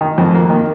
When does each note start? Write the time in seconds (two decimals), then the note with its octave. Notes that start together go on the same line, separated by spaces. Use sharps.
0.01 D#3
0.18 F2
0.35 A#3
0.50 D#3